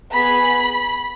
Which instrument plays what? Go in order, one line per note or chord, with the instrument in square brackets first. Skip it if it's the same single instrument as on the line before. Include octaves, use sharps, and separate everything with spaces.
[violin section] B3 G#4 B5